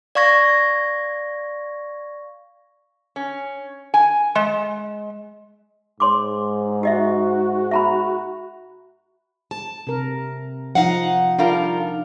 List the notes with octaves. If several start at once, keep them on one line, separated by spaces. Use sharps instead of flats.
D5 F5 C#6 G#6 A#6
C#4
G#5
G#3
G#2 C#5 C6 D6
F#4 G4 D#5 E5
E5 A#5 B5
A5
C3 A#4
F3 D#4 F5 F#5
G3 D4 F4 A#4